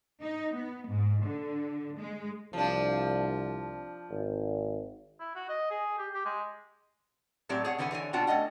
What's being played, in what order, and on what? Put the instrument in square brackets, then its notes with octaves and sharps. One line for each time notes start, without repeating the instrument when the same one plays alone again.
[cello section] D#4
B3
G#2
D3
G#3
[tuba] C2 [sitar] F3 D4
[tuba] G#1
[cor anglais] E4
F#4
D#5
G#4
G4
G4
G#3
[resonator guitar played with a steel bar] A2 F#3 C4 G4 D5
G#4 C#5 F#5
D3 E3 B4 F#5 G#5
D3 E3 C#5 G#5
B2 D4 F4 F#4 F#5 G5
A3 C4 C#4 D#5 F#5